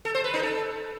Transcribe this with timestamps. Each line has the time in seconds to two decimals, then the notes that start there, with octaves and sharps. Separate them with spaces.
0.05 A4
0.15 C5
0.24 B4
0.34 D#4
0.43 A4